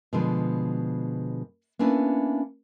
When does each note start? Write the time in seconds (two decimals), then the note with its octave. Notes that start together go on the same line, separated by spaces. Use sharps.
0.13 B2 D3 F3 G#3 B4
1.79 A#3 B3 C#4 D4 E4 B4